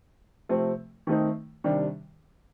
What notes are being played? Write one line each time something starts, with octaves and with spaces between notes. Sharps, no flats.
C3 F3 A3 C4
D#3 A3 C4 D#4
C3 D#3 G3 D4